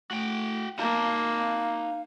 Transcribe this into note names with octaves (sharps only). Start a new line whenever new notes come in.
A3 F#4 G5
A#3 D#4 F5 A5